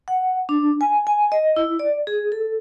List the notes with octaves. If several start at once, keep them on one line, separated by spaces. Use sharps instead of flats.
F#5
D4
G#5
G#5
D#5
E4
D5
G#4
A4